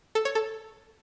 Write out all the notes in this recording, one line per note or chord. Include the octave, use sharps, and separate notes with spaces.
A4
C#5
A4